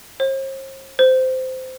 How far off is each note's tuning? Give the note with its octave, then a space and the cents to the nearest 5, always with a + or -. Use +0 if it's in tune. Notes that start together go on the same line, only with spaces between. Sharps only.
C5 +45
C5 -15